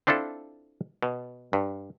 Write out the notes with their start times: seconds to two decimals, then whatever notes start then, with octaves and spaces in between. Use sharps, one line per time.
0.07 C4 D4 E4 F4 A4
1.03 B2
1.53 G2